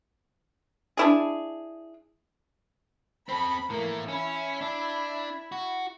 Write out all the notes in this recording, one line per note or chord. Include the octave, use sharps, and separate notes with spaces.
D4 E4 G#4
C4 A4 B5
A2 E3 A3 A#3
C#4 E4
D4
F#4